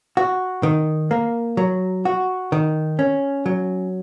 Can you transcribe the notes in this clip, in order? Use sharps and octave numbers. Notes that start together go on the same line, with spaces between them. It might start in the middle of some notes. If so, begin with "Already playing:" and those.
F#4
D#3
A#3
F#3
F#4
D#3
C#4
F#3